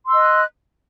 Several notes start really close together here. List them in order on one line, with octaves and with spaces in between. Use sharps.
C6 E6 D#5 F#6